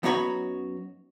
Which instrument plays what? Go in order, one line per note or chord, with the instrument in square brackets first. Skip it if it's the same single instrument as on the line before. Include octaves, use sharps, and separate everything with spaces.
[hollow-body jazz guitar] F#2 B3 D#4 F#4 C#5 B5